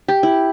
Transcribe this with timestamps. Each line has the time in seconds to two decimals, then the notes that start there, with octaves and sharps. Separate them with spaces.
0.08 G4
0.23 E4